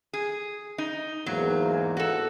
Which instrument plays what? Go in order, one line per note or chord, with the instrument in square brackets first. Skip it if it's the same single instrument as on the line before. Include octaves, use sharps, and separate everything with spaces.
[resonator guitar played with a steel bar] G#4
D#4
[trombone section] E2 G#2 A#3 [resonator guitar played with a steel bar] F#3
[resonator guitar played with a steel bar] F#4 A4